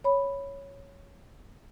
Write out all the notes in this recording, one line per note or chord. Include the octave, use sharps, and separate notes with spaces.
C#5 B5